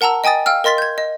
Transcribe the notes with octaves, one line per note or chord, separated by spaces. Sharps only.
A#4 F#5 A5 A#5 E6
D#5 G5 G#5 D#6 A6
F5 G5 E6 F6
A#4 D#5 C6 A6 B6
G6 G#6
D#5